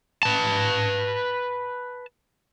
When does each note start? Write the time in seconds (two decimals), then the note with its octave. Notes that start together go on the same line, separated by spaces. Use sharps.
0.23 B4 A5